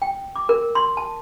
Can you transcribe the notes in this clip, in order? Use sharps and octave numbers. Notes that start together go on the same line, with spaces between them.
G5
D6
A#4
C6
A5